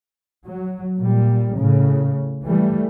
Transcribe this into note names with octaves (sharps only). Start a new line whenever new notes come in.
F#3
A#2 G3
A2 C#3
E3 G3 A3